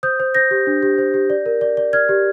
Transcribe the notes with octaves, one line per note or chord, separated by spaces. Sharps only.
C5 D#6 G6
C5
C5 G6 A#6
G4
D4
G4
C5
G4
D5
A#4
D5
D5
D5 F6 G#6
G4